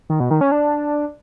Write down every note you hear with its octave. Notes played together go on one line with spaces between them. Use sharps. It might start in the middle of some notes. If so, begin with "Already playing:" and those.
D#3
B2
D#3
C#4
D4